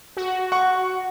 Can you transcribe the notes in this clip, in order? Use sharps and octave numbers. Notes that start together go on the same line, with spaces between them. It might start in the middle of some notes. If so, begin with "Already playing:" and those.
F#4
F#5 C#6